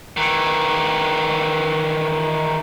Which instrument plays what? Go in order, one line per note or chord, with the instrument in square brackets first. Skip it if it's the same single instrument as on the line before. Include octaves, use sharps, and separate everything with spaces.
[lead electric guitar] D#3 E3